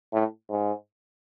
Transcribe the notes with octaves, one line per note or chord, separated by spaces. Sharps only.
A2
G#2